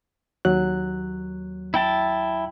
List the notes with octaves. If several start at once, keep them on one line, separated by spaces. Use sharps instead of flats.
D#2 F#3 F#6
E4 G5 A5